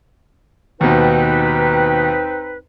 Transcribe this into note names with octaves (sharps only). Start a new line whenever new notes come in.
D#2 B2 C4 D#4 B4